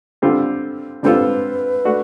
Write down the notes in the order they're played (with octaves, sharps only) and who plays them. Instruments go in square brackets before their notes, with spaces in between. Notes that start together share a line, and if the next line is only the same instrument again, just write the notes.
[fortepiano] D3 G3 C4 F4 A4
[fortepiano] D3 G3 C4 F4 A4 [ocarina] B4
[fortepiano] A3 D4 F#4